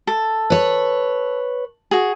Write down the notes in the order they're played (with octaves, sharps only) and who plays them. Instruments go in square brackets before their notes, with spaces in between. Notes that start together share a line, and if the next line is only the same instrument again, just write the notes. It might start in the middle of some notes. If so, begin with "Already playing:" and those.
[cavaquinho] A4
[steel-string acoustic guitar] B4 C#5
[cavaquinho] F#4 G#4